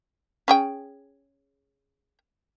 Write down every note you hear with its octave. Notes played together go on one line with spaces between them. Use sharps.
C#4 G#4 G5